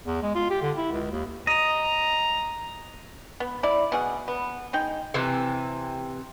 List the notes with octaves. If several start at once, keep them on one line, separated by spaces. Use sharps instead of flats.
E2
G#3
F4
G4
D3
E4
C#2
D#2
D#5 A#5
B3
E4 D5
B2 G#4 F#5
B3
G#3 D#4 G5
C3 E3